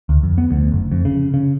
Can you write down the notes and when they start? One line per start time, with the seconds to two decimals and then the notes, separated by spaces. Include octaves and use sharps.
0.09 D2
0.23 F2
0.38 B3
0.51 D2
0.72 F#1
0.92 F2
1.05 C#3
1.34 C#3